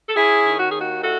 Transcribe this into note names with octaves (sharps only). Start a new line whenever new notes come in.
A4
C#4 E4 G#4
D#3
F#4
D#2 G#4
F#4
E4 F#4 A4